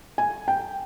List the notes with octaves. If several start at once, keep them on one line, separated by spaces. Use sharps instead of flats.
G#5
G5